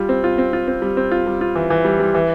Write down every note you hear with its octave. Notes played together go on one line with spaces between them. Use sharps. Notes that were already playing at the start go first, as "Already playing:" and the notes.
Already playing: G3 F4
C4
F4
C4
F4
C4
G3
C4
F4
G3
F4
E3
E3
G3
G3
E3